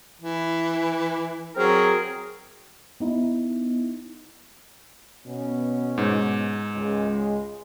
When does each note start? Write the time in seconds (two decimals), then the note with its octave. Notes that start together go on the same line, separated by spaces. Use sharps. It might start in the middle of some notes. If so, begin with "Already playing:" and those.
0.21 E3
1.56 F#3 C4 G#4 A#4
3.00 B3 D#4 E4
5.26 B2 B3 C#4
5.98 G#2
6.74 C#2 G#3